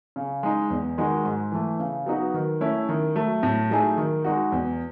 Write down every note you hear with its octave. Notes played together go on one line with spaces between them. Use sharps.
C#3
G#3 D#4
E2
D#3 G#3 D#4 F#4
G#2
E3 A3
C#3
F#3 B3 D#4 F#4
D#3
A3 C#4 E4
D#3
F#3 A3
A2
F#3 A3 D#4 G#4
D#3
G#3 D#4 F#4
E2